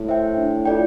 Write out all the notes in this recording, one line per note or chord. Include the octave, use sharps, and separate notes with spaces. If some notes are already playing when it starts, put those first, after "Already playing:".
Already playing: A2
C5 E5 G5
D4
F4 A4 D5 G5